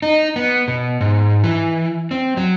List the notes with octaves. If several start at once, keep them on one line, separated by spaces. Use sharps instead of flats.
D#4
B3
B2
G#2
E3
C4
F#3